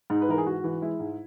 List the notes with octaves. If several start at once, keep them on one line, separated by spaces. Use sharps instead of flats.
G#2 D#4
B4
E3 A#4
G#4
G#2 F#4
E3
G#3 E4
G#2